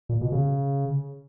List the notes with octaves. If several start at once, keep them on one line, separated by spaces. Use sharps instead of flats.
A#2
B2
C#3